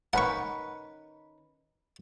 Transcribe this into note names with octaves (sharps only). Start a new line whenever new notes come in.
D#3 C#4 B4 F#5 C#6